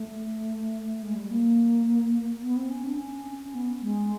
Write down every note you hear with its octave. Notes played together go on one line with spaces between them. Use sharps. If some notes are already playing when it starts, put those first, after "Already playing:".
Already playing: A3
G#3
G3
A#3
B3
C4
C#4
D4
C#4
B3
G#3